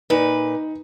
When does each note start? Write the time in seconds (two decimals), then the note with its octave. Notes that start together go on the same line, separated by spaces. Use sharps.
0.10 A#2 D#4 B4